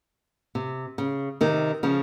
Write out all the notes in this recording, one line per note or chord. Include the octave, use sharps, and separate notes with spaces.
C3
C#3
C3 D#3
C#3 F3